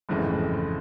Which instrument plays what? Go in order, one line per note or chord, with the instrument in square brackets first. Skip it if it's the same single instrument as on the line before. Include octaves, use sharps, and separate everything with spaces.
[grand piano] G1 F2 C#3 E3 A3 [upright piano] A2
[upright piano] G#2
A2